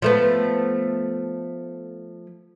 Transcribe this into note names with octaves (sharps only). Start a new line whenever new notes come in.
F3 A3 B3